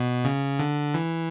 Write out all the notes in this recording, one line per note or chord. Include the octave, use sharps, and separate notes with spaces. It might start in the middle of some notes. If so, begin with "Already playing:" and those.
Already playing: B2
C#3
D3
E3